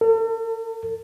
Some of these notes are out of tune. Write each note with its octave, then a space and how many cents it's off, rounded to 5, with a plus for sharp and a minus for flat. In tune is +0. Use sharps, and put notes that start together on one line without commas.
A4 +45